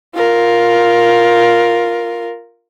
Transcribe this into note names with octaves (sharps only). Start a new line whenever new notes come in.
F4 A#4